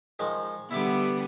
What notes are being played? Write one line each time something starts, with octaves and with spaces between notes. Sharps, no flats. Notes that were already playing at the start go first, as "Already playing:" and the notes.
D#3 F3 G#3
D3 G3 B3 E4 E5 D6